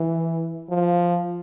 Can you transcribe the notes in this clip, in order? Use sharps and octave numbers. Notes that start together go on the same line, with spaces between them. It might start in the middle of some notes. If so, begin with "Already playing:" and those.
Already playing: E3
F3